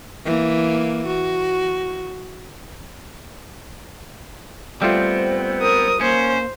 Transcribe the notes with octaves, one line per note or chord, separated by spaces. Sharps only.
E3 A#3
F#4
G3 A3 B3 C4 F4 C5
A#4 D#6
A#3 C#4 C5